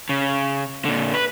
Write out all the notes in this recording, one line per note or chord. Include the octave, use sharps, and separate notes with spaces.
C#3
A#2 D3
B4